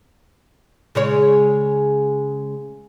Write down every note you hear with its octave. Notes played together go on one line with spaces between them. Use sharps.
C#3 G#3 C#5